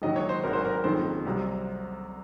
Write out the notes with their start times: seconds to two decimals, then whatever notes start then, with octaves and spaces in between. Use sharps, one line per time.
0.02 A#1 G#2 D#3 F#3 D#5
0.16 C#5
0.29 C5
0.43 G#1 G#2 F#3 A#4
0.53 C5
0.65 A#4
0.84 F#1 F2 D#3 F#3 C5
1.26 C2 C3 F#3